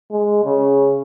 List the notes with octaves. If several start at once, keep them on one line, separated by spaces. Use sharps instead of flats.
G#3
C#3